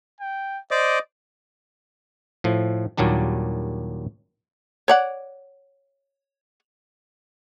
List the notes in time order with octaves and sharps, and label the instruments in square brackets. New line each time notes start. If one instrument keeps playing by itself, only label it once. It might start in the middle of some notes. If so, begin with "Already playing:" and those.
[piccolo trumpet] G5
[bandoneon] C5 D5 D6 [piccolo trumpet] D#5
[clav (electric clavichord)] A2 F3
D#2 A#2 F#3 G3 D4
[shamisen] C#5 D5 F#5